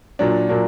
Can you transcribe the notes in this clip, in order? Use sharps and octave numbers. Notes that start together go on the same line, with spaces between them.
A#2 F#3 A#3 D4
A#2 F#3 A#3 D4